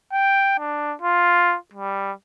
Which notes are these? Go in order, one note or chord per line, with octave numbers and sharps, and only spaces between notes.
G5
D4
F4
G3